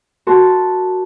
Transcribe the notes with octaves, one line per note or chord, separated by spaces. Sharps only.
F#4 A#4 A5 C6